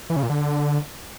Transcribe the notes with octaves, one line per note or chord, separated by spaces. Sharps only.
E3
C#3
A#2
D3